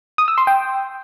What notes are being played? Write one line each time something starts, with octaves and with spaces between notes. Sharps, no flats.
D#6
E6
C6
G5